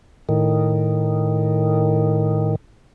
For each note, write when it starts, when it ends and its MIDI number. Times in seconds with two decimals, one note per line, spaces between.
0.29 2.55 45
0.29 2.55 51